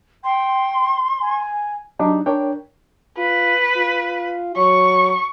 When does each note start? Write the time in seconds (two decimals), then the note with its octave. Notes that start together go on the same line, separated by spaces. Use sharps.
0.24 G5 C6
1.21 G#5
1.99 F#3 D4 D#4 G4
2.26 D4 A#4 C#5 G5
3.18 F4 B4
3.77 F4
4.56 F#3 C#6